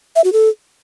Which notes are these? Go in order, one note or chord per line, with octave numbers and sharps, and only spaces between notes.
E5
F#4
A4